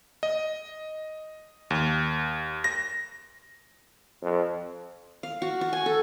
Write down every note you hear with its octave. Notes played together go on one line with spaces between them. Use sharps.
D#5
D#2
A#6
F2
F5
F#4
F#4
G#5
A4